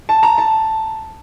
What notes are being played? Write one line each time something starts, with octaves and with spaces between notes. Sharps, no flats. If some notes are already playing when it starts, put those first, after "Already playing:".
A5
A#5
A5